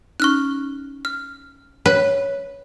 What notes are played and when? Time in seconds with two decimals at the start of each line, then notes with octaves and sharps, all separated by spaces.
0.20 C#4 D#4 C#6 F6 F#6
1.05 F6
1.86 B4 C#5